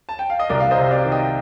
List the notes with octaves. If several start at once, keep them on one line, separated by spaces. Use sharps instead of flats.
A5
G5
F5
D#5
C2 A#4 D5
F5
C5 D#5
C3
D5 F5
D#3
D#5 G5